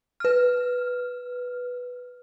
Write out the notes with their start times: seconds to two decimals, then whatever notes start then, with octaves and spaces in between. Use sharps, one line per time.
0.20 B4 F6